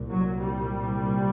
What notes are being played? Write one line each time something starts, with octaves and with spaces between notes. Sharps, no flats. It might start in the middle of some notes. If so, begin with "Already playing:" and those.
Already playing: C2 A#2
F#3
G3